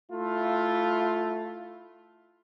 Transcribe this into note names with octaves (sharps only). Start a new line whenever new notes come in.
A3 E4 F4